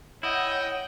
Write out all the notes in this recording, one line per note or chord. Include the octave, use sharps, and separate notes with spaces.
E4 C#5 D#5 F#5 G5